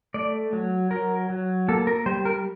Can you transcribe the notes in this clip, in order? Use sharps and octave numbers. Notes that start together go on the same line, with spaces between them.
A3 D5
F#3
F#3 A#4
F#3
A#3 A4
A#4
G3 C5
A#4